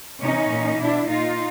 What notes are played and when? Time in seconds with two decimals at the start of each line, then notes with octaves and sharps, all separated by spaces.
0.21 C3 E3 C#4 D#4
0.50 A#2
0.80 B2 D4 E4
1.08 A#2 D#4 F4